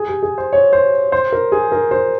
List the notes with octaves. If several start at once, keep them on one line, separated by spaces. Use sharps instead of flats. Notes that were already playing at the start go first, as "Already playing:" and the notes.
Already playing: G#4
G4
G#4
C5
C#5
C5
C5
A#4
G#4
A#4
C5